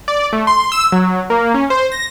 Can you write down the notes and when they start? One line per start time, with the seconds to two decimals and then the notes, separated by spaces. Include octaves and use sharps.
0.08 D5
0.33 A3
0.47 C6
0.72 E6
0.92 F#3
1.30 A#3
1.54 C#4
1.70 C5
1.92 A#6